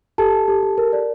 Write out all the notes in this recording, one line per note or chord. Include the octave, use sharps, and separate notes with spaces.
G4 A4 A5
G4
G4
G4
A#4
D5